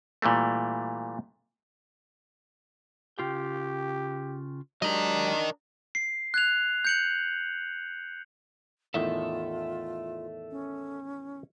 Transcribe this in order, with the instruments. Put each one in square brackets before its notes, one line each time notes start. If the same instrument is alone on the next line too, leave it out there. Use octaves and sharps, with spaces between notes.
[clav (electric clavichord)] A#2 E3 G3 A3
[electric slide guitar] C#3 F4 G5 [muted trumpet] G4
[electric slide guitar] F#3 G#3 G4 [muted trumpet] D4 [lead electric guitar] A#4 D#5
[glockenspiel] C7
F#6 G#6 F7
G6 C#7 F#7
[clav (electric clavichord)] E2 A2 D#3 [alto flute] F4 [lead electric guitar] A4 E5
[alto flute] C#4